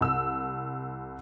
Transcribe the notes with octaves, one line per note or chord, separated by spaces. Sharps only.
C2 E6